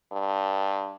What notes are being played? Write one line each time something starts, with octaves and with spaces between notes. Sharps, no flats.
G2